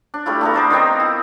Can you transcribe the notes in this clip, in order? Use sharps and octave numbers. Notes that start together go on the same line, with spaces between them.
D4
G3 A3 E4 F4
A3 B3 A#4
A#4 C5 D5
D#3 B3 C4 D#4
E4